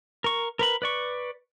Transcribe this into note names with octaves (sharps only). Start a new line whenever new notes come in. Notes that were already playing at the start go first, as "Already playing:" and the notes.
A#4 C#6
A#4 B4 B5
B4 D5 C#6